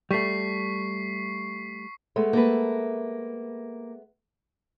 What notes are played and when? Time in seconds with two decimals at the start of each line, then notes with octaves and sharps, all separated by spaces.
0.11 G3 A3 C#6 B6 C7
2.16 G#3 A3 B3
2.33 A#3 A4 B4